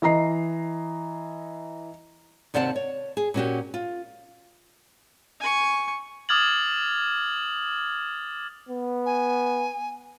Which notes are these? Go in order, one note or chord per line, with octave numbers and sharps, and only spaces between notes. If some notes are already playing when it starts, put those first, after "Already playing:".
E3 D#5 A#5 C7
D#2 C3 D5 F#5 A5
C#5
G#4
A#2 C#4 F#4 G4
F4
G#5 C#6
D6 D#6 F6 G#6 A6 F#7
B3
G#5